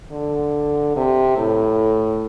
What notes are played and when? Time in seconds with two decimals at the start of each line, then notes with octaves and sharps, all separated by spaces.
0.12 D3
0.96 C3
1.37 A2